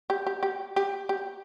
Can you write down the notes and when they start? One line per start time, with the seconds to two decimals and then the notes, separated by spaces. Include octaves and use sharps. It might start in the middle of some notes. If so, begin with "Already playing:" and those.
0.10 G4
0.26 G4
0.43 G4
0.76 G4
1.09 G4